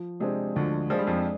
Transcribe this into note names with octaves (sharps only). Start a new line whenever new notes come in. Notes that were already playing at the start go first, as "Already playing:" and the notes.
Already playing: F3
C3 G#3 D4 G#4 C5
D2 D3 F3
F3 G#3 D4 G#4 C5
G3
F2 F3